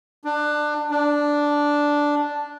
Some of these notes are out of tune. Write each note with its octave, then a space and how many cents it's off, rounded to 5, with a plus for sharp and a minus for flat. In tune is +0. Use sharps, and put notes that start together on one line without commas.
D4 +20
D4 -5